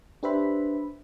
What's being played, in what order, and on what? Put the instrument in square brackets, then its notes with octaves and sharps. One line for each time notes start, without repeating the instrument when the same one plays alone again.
[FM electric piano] D4 G4 B4 C5 E5 B5